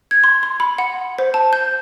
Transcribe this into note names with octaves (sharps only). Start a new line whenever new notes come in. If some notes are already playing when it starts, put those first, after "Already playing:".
G#6
C6
C6
B5
F#5
C5
A5
G6